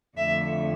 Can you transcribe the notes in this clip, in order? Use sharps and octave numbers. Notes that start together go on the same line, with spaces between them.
F2 D3 A3 E5